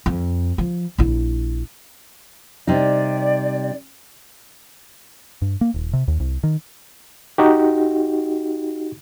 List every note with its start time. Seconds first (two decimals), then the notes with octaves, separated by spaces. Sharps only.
0.06 F2
0.58 F3
0.98 A#1 E4
2.67 C3 G3 D#4 D5
5.42 G2
5.61 A#3
5.74 D#1
5.93 C3
6.08 D#2
6.20 C2
6.43 D#3
7.38 D#4 F#4 G4